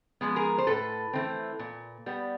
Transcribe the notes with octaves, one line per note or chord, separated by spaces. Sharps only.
F3 G#3 B3
G#4 A#4
C5
A2 A4 B4
E3 A3 C4
A#2
G3 B3